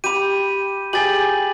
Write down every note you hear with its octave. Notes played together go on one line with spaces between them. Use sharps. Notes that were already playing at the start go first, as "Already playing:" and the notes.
G4 B5 D#7
G4 G#4 G5 G#5 A6 F#7